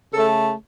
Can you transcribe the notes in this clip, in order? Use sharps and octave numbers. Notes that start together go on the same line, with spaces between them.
C#3 A3 A4